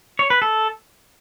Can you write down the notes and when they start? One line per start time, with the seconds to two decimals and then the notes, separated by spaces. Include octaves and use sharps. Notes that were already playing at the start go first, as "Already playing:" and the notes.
0.19 C#5
0.30 B4
0.42 A4